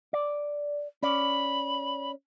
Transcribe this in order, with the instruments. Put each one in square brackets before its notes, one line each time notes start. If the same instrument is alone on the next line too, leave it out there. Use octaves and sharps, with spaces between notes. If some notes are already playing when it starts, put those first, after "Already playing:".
[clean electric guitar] D5
[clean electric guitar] C#4 D5 [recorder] B5